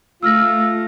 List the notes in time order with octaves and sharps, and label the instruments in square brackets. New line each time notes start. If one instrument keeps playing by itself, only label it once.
[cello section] A3 [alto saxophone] F4 [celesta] E6 F6 A#6